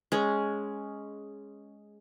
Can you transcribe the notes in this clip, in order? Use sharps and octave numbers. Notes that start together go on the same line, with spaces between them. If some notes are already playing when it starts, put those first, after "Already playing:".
G#3 C#4